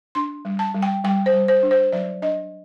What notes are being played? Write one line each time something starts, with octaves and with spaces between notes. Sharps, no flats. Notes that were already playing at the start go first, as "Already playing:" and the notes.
D4 C6
G3
A5
G3
G5
G3 G5
C5
G3
C5
D4
C5
F#3 D5
D4 D#5